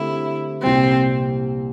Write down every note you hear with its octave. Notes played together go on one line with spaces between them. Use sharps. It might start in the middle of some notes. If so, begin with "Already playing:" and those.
Already playing: D3 A3 C4 E4 G4
C2 A#2 G3 C4